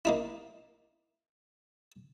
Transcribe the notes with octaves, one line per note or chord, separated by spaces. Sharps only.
A#3 D#4 E4